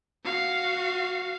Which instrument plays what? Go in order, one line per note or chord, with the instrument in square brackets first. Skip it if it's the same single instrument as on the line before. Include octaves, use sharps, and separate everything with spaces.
[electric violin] F#4 F5